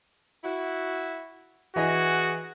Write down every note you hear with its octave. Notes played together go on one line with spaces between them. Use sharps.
E4 F#4
E3 F#4 G#4 D#5 A#6